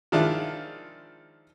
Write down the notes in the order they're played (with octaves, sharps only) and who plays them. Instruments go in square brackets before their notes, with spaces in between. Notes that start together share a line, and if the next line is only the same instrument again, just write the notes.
[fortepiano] D#3 F3 G#3 D4 E4 F4